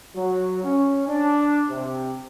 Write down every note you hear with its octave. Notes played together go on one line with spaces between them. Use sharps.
F#3
C#4
D4
C3